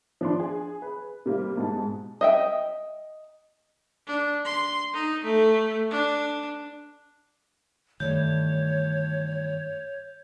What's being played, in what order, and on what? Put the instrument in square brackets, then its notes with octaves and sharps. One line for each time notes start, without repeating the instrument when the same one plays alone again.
[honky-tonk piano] F3 D4 C6
G#4
B4
C3 G3 A#3
G#2 B2 G#4 A5
[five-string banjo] D#5 E5 G5
[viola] D4
C6
D#4
A3
D4
[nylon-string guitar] G2 E3 A3 [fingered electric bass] D#3 [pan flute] C#5 [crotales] G6